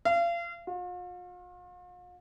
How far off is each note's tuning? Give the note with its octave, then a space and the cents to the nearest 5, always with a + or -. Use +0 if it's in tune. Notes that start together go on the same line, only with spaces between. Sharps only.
F5 -35
F4 +45